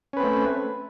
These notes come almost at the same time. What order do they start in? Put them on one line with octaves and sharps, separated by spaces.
C#4 B4 C4 A3